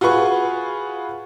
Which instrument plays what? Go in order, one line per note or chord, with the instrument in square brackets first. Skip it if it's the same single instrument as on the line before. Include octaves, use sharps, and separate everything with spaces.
[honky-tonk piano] F4 F#4 G#4 B4 C#6